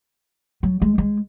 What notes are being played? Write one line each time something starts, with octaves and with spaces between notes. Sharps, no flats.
F#3
G#3
G#3